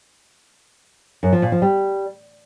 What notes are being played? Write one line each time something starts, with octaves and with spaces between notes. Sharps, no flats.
F#2
F3
A#2
F3
G3